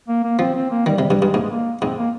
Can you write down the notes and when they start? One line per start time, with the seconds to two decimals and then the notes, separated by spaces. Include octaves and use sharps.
0.08 A#3
0.23 A#3
0.39 F3 C4
0.55 C4
0.71 A#3
0.86 D#3 G3
0.99 C3 G3
1.10 G2 G3
1.22 G2 G#3
1.34 G#2 A#3
1.43 G#3
1.51 A#3
1.81 G#2 C4
1.98 A#3